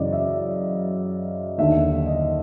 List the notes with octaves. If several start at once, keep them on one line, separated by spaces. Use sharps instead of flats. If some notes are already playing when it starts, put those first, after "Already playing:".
Already playing: F#2 C#3 E3 D5 D#5
E5
D#2 D3 E5
D#5